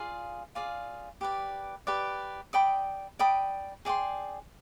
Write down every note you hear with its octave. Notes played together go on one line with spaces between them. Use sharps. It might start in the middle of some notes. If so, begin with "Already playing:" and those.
Already playing: F4 G#4 D5 F5
F4 G#4 D5 F5
G4 B4 D5
G4 B4 D5
D5 G5 B5 D#6
D5 G5 B5 D#6
G#4 D5 G5 C6